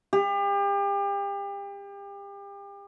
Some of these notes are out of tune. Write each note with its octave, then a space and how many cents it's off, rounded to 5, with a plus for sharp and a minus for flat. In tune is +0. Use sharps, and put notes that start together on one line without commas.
G4 +35